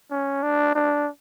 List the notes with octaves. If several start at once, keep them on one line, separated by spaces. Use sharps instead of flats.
C#4
D4
D4